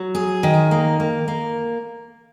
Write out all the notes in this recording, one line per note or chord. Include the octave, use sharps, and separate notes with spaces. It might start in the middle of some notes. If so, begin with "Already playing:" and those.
Already playing: F#3
G#4
D#3
A#3
A#3
A#3